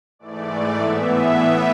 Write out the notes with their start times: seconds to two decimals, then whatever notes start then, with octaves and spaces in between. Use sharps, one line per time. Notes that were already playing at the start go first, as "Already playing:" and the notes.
0.19 G#2 E3 A3 D5
0.48 D5
0.76 A2 E3 B3 E5